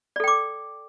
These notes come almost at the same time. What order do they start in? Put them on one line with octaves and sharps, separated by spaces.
D5 A4 G5 D6